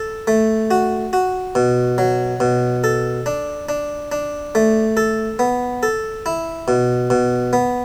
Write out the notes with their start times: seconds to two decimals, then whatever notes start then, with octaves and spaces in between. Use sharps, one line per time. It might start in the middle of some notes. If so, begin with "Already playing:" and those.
Already playing: A4
0.27 A3
0.71 F#4
1.13 F#4
1.55 B2
1.98 F#3
2.40 B2
2.84 A4
3.26 D4
3.69 D4
4.12 D4
4.55 A3
4.97 A4
5.39 B3
5.83 A4
6.26 E4
6.68 B2
7.10 B2
7.53 B3